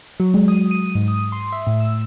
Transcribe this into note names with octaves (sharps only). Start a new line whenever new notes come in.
F#3
G#3
D#6
D#7
G#2
D#6
C6
E5
A2
E6